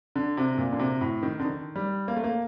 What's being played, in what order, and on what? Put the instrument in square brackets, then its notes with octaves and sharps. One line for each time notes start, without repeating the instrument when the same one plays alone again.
[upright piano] D3
C3
A#2
D3
C3
A2
D#3
D3
D#3
G3
A#3
A3
A#3